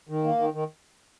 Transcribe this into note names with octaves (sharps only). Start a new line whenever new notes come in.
D#3
A#3
D#3
D#3